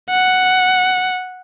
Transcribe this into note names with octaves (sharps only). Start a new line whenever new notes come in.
F#5